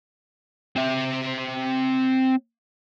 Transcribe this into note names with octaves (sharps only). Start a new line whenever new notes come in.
C4 E5